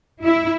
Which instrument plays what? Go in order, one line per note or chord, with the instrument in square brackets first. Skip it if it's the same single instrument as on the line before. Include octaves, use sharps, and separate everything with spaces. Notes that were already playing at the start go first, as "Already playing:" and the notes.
[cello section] E4